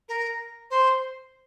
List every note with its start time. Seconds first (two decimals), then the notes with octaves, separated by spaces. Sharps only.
0.08 A#4
0.70 C5